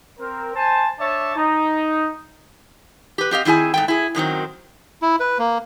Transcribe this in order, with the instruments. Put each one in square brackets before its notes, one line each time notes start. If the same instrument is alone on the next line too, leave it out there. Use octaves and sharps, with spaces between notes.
[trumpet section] C4 A#4
C5 G#5 A5
D4 C#5 D5 E5 A5
D#4
[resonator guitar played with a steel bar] G4 B4
C4 G4 D#5 F5
D#3 C4 E4 G#4 G#5
G#2 A3 G5
E4 G#4
F#2 D#3 F#3 C4
[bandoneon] E4
B4
A#3